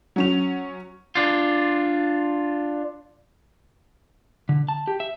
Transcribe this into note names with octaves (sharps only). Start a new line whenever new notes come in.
F#3 C#4 F7
D4 F4
D3
A5
G4
E5